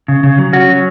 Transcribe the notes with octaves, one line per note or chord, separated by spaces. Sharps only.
C#3
C#3
F#3
C#4 F#4
F#3